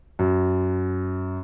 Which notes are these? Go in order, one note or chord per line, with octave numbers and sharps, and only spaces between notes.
F#2